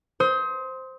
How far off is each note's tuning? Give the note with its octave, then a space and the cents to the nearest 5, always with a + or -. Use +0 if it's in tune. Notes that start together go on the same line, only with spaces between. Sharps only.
C5 +0 D#6 +40